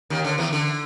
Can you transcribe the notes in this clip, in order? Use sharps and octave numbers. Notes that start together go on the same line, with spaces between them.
D#2 D#3
D3
E2 E3
D3